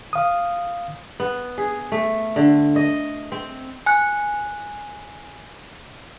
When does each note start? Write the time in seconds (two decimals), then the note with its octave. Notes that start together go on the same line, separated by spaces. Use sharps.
0.13 F5 D#6
1.20 B3
1.58 G#4
1.92 A3
2.36 D3
2.76 D#5
3.32 C4
3.86 G#5 F#6